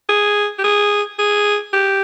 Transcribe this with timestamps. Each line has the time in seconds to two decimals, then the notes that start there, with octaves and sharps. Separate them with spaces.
0.09 G#4
0.59 G4
0.64 G#4
1.19 G#4
1.73 G4